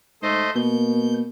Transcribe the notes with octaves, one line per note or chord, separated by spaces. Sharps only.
G#2 A3 C5 D#5
B2 A#3 G6